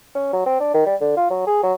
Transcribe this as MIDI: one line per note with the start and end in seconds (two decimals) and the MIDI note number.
0.15 0.33 61
0.33 0.44 54
0.46 0.58 60
0.60 0.70 62
0.74 0.86 51
0.86 0.95 55
1.01 1.12 50
1.17 1.26 65
1.30 1.44 54
1.47 1.61 68
1.63 1.74 54